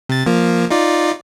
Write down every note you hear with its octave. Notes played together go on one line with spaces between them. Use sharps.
C3 A6
F3 A#3
D#4 F4 D5